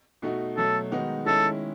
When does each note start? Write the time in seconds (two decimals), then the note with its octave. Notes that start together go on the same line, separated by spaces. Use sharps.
0.22 B2 A3 D#4 F#4
0.57 B2 F#3 A3 A4
0.92 D#3 G#3 B3 D#4 F#4
1.26 D#3 G#3 C#4 E4 A4